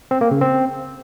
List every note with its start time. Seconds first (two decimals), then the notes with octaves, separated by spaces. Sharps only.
0.11 C4
0.21 A#3
0.31 C#3
0.41 C4